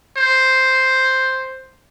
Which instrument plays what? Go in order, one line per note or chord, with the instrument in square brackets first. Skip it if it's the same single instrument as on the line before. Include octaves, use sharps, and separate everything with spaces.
[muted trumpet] C5